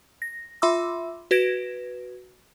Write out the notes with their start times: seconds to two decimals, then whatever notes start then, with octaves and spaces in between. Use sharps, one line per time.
0.22 A#6
0.62 F4 E5 B5 C6 D6 E6
1.31 F#4 B4 G#6 A#6 D7 E7